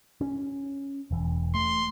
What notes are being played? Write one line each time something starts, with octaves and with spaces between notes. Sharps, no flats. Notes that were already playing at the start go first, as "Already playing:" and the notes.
C#4
E1 E3
A3 C6